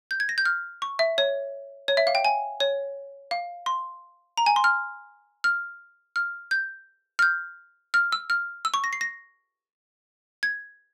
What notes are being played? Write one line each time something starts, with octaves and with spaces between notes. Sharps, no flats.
G6
G#6
A#6
G6
F6
C#6
E5
C#5
C#5
E5
F5
G5
G#5
C#5
F5
C6
A#5
G#5
C6
F6
F6
F6
G6
F6
G6
F6
E6
F6
E6
C#6
A#6
C7
A#6
G#6